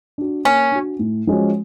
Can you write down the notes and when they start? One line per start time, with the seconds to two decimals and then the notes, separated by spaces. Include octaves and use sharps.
0.18 D4 F#4
0.45 A#3 C#4
0.72 D4 F#4
0.99 A2
1.27 F3 G#3 C#4 F#4